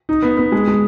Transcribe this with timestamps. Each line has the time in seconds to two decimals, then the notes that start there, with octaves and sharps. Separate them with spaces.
0.09 D#4
0.23 B3
0.37 B3
0.52 G#3
0.67 G#3